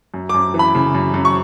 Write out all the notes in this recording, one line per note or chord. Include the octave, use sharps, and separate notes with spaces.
F#2
F#2 D6
E3
B5
C#3
F#2
F#2
C#6